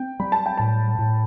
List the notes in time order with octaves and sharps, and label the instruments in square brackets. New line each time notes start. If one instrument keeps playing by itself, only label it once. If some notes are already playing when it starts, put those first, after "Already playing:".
Already playing: [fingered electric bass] C4 [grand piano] G5
[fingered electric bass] G3 [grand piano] B5
[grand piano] A5
G5
[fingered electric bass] A2 [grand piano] A5
[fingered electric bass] A2